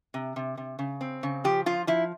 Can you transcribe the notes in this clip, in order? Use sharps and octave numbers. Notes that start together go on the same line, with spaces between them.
C3
C3
C3
C#3
C4
C#3
F3 G4
F3 F4
F3 E4